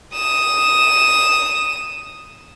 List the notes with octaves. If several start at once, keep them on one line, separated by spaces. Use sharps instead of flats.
D#6 E7